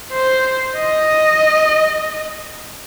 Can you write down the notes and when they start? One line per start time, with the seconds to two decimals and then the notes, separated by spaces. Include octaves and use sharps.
0.12 C5
0.76 D#5